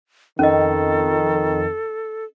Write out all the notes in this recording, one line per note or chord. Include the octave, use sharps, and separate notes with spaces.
F2 D#3 C#4 A4 D#5